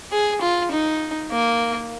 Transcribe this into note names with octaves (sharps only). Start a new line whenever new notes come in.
G#4
F4
D#4
A#3